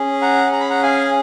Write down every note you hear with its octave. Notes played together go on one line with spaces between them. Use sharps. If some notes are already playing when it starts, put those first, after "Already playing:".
Already playing: C#4 G#4
F#5 A#5
A#5
B5
F#5 A#5
F5 G#5